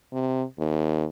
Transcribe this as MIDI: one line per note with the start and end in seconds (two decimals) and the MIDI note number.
0.12 0.43 48
0.58 1.05 39